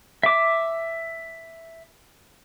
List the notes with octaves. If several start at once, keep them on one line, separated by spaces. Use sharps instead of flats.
E5 D6